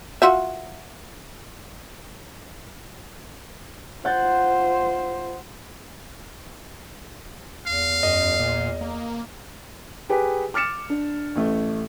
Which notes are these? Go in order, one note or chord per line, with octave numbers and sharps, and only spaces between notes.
F4 F#4 E5
F4 C5 F#5 G6 A6
E2 F5
F#2 D#5
A#2
A#3
G4 G#4 B4
D6 F6 A6 C#7 E7
D4
A1 A3